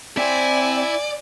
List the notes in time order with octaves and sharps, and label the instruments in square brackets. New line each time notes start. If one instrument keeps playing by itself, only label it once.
[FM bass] C4 [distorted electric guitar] E4 [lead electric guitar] D5 [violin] G#5